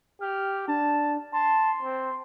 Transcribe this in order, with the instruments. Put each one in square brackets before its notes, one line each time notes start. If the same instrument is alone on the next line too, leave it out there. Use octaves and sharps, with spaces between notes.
[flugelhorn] G4 [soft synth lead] F6
[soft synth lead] D4 [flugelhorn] A5
[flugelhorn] A5 [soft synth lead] C6
[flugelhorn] C4